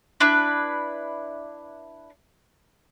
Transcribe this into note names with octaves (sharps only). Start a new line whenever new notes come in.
D4 E4 B4